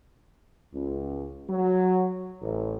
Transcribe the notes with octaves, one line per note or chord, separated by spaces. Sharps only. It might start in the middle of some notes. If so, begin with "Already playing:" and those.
C#2
F#3
A1